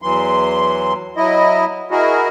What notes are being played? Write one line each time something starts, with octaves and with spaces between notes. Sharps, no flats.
E2 E3 F#3 C6
F#3 E4 D#5
E4 F#4 G#4 A#4 D#5